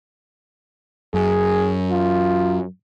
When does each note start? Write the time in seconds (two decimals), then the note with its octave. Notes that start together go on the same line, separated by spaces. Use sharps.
1.14 F#2 G#4
1.91 F4